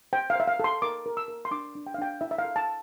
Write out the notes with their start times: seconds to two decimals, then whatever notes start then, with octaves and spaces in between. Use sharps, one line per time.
0.13 C5 G5
0.30 F5
0.36 C5 E5
0.47 F5
0.60 A4 C6
0.82 A#4 D6
1.06 A#4
1.17 E6
1.28 A#4
1.45 C6
1.51 D4 D6
1.75 D4
1.87 G5
1.94 F5
1.98 D4 G5
2.21 E4 E5
2.31 E5
2.38 F5
2.45 A4
2.56 A5